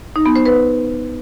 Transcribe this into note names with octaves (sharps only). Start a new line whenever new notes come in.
D#4
B3
C5
B4